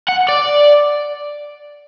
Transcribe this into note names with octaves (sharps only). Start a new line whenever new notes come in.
F#5
D5